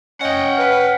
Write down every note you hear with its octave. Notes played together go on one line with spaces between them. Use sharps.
C#4 D#5 F#5 G5
B4 F6